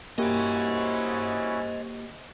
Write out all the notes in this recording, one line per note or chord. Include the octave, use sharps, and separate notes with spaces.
A#3 C#4 E4 F#4 G4 C5 D#5